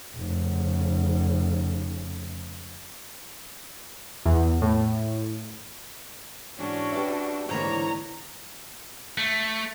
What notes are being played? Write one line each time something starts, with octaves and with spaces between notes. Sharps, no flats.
F1 C#3
E2
A2
G#2 E3 C#4 D4 F#4 A5
G4 B4 E5
G#2 D3 E3 A#3 C#5 A#5
A3